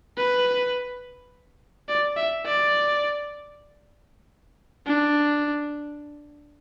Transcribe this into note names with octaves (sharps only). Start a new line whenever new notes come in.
B4
D5
E5
D5
D4